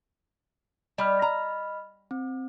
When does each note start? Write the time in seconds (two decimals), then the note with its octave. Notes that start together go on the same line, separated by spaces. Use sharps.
0.98 G3 D#5 B5 F6
1.22 A#5
2.11 C4